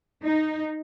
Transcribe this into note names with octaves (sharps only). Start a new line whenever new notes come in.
D#4